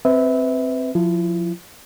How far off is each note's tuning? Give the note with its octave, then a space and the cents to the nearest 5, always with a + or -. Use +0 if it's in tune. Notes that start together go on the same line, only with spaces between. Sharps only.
C4 +0 B4 +20 E5 -20
F3 +25 E4 +35